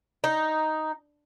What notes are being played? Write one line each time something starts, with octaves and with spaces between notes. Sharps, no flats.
D#4